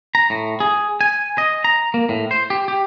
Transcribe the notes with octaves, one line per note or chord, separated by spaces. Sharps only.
A#5
A2
G#4
G#5
D#5
A#5
A#3
A2
C5
G4
G4